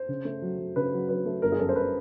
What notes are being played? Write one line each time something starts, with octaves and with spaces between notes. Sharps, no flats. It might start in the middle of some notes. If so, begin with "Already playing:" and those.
Already playing: C5
C#3
A3
F#3
F#3
C#3 B4
F#3
F#3 B4
A3
G1 A#4
G#4
F#2 A4
C5
B4